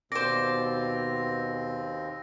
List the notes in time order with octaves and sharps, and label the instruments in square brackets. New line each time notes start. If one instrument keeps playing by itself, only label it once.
[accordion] D#2 C4 [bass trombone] B2 [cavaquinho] C5 D5 [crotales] A#6